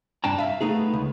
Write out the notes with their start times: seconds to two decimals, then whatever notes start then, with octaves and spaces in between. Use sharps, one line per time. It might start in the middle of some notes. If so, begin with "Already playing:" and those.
0.24 G2 D4 G5 A5 A#5
0.38 E5 F5
0.61 A3 B3 D#4 G#4
0.93 C#2